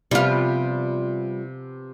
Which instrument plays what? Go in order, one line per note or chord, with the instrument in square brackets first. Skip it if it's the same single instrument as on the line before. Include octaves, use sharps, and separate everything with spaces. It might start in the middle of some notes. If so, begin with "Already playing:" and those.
[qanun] C3 F3 B3 [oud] G3 F4